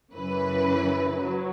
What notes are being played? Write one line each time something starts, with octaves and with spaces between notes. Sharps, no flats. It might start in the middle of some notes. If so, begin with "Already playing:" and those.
F#2 C#3 E3 B4
F#3